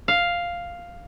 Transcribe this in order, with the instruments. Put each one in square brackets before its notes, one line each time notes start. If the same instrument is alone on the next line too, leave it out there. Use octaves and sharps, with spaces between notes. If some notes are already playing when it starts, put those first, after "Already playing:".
[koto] F5